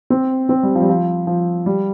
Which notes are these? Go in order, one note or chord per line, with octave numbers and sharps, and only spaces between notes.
C4
C4
G3
F3
G3
F3
F3
G3